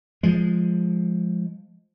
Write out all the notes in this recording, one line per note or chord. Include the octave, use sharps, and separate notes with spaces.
F3 G#3